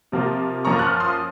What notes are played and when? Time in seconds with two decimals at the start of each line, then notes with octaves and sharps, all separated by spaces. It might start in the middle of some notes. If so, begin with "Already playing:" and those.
0.12 C3 F3 A#3
0.65 F#2 F3 A#3 A#5 C#6
0.79 F#6
0.82 C#6 F6
1.00 C6 D#6